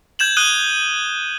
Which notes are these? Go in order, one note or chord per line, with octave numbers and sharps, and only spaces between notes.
G6 G#6 E7 F#7
D#6 F#6 D#7 F#7 G7